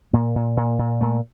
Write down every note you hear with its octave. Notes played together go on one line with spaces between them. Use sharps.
A#2 A#3
A#2
A#2
A#2
A#2 A3